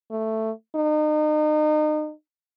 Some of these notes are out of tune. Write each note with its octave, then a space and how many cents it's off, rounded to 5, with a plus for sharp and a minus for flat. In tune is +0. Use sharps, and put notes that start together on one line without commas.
A3 +5
D#4 -35